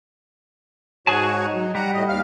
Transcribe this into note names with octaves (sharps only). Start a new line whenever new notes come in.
G#2 F#4 G#4 C#5 G#5 A5
D#4
F#3
G3 F#5 A#5
A2 D#5
D#2 F5 F6